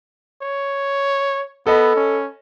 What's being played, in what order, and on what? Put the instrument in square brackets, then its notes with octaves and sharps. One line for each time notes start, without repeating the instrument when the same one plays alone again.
[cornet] C#5
[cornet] B3 [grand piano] A4 D#5 B5
[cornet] C#4